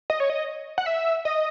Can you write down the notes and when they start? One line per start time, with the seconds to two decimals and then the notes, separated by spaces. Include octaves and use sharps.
0.10 D#5
0.20 C#5
0.30 D#5
0.78 F#5
0.86 E5
1.25 D#5